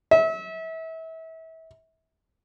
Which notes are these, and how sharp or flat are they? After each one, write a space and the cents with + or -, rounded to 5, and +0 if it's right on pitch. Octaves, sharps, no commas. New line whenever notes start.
E5 -30